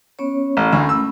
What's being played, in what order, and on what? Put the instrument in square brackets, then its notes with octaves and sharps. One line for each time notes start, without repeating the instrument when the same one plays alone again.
[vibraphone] B3 C#4 C#5
[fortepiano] A1
[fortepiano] D2 [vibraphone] A3 C#4 B5
[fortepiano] E6